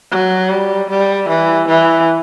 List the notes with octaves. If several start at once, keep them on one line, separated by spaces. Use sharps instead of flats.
F#3
G3
G3
E3
E3